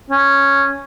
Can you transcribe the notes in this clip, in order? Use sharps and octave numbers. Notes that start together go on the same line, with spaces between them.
C#4